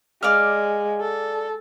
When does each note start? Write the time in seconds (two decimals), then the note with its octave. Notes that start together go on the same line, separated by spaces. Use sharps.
0.23 G#3 D5 F5 F6
1.01 A4